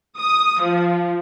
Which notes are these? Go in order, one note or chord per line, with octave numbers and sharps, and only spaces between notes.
D#6
F3